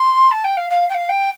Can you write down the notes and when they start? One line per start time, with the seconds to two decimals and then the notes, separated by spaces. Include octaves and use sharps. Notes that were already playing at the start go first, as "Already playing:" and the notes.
Already playing: C6
0.31 A5
0.44 G5
0.57 F5
0.70 F5
0.89 G5
0.94 F5
1.09 G5